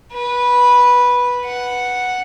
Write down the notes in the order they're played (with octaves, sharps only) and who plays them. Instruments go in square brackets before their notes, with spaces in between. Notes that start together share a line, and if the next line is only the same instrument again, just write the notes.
[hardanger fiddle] B4
F#5